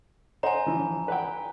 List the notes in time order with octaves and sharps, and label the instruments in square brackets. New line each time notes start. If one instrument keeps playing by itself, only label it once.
[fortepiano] C5 D#5 F#5 [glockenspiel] G#5 A#5
[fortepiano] E3 F3
B4 F#5 G5